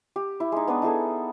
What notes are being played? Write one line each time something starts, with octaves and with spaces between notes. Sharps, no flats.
G4
E4
G#3 D#4
B3 D4 B4
D#4 E4 G#4 A4